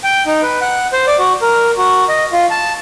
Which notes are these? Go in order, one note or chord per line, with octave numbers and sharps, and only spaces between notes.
G5
D#4
B4
F#5
C5
D5
F#4
A#4
F#4
D#5
F4
A5